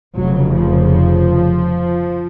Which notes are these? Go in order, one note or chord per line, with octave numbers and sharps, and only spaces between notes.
F1 F2 C#3 F#3
F3